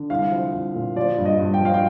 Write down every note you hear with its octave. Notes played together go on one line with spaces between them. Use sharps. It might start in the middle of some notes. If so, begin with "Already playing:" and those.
Already playing: D3
C2 F5
F3
C2
A#2
F3 D5
G2
D#5
G2
G5
F3 F5
G5